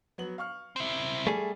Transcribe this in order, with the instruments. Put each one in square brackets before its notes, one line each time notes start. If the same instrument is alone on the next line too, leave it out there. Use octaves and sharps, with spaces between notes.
[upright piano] F#3 B3 F#7
F5 C#6 F6
[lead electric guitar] C4 E4
[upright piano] G3 [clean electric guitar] A3 G#4